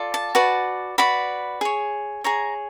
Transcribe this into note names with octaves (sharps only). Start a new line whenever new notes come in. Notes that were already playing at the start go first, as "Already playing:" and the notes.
Already playing: F4 A4 D5
A5
F#4 B4 D5
F#4 B4 D5 B5
G#4 C#5
G#4 C#5 A#5